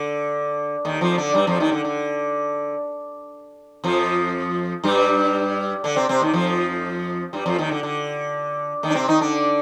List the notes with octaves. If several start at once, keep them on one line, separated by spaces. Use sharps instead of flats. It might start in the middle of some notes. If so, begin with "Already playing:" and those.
Already playing: D3
D#2 D#3
F2 F3
D3 D4
G2 G3
F2 F3
D#2 D#3
D3
D3
F2 F3
G2 G3
D3 D4
C3 C4
C3 C4
D#2 D#3
F2 F3
G2 G3
F2 F3
D#2 D#3
D3
D3
D#2 D#3
D4
C3 C4
D#3 D#4
D3 D4